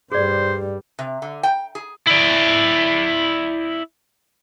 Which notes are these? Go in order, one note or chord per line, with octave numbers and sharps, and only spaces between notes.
G2 G3 G#4 C5 D5
C3
D3
G5
G#4
E4 D5